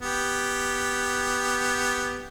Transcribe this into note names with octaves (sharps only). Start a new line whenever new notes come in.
B3 G4